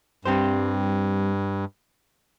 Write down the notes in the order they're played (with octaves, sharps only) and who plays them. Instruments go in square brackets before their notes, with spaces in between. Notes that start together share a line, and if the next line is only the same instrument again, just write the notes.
[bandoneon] G2 [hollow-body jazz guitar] G3 C4 G4 C5